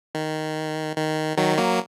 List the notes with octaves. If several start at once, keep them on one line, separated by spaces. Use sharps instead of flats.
D#3
D#3
D#3 F#3
F#3 A#3